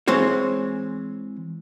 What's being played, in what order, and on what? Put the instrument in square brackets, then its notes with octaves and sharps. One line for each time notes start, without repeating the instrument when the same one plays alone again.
[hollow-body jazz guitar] E3 G#3 C4 C5 C#5